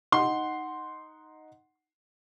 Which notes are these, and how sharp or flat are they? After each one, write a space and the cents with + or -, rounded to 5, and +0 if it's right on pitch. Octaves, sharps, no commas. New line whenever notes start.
D#4 +0 F#5 +0 C6 +0